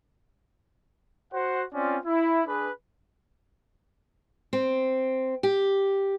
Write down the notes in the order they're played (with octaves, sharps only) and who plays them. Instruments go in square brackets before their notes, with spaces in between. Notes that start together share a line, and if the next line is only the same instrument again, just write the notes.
[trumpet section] F#4 C5 F#5
C4 C#4 F4 D5
E4
D4 G#4 B4
[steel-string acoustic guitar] C4
G4